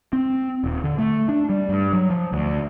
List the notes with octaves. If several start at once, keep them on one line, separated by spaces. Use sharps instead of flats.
C4
D#1
D3
A3
D4
G3
G2
F#3
F3
D2